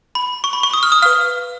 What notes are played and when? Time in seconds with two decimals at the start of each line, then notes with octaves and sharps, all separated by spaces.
0.15 B5
0.44 C#6
0.53 B5
0.63 C#6
0.73 D#6
0.83 F6
0.92 D#6
1.02 B4 F5 F6